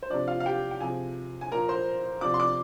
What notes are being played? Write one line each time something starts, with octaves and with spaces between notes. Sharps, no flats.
C5
C3 F3 D4 D5
F4 F5
F5
G4 G5
G5
C3 F3 G#4 G#5
G#5
A#2 F3 A#4 A#5
C5 C6
C3 F3 D5 D6
C6
D5 D6